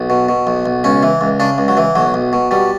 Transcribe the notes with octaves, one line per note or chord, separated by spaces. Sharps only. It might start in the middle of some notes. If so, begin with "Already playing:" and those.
Already playing: B1
B2
B2
B1
B1
C#2 C#4
E3
C#2
C#3 D4
C#2
F#3
E3
B1 F#3
B1
B2
B2 G3